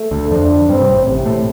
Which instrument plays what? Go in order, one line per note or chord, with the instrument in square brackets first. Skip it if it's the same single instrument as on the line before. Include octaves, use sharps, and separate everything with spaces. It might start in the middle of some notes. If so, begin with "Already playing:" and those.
Already playing: [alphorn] A3
[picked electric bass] D2 D3
[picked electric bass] F2 F3 [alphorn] D4
[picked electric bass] G2 G3 [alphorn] C4
[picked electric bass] C3
A1 A2
[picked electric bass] A1 A2 [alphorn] C3
[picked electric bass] A2 A3